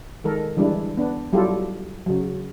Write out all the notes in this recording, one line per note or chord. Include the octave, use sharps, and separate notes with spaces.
D#3 G#3 A4 A#4
D3 E3 G3 G#3 D4 E4
B3 D4
F#3 G3 E4 F4 G4 A4
C#3 F#3